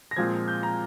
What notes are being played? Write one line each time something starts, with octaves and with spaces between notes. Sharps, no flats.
A#6
A#2 F3 G#3 C4 G#6
G6
A#5